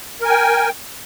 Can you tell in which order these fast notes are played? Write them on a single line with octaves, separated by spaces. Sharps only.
A#4 G#5 G5